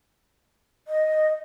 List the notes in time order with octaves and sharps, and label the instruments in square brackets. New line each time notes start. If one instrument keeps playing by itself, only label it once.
[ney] D#5